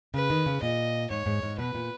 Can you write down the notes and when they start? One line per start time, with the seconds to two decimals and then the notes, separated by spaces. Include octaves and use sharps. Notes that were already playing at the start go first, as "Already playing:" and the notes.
0.14 C#3 B4
0.30 D#3
0.46 C#3
0.62 A#2 D#5
1.10 G#2 C#5
1.26 G#2
1.43 G#2
1.59 B2 B4
1.75 A#2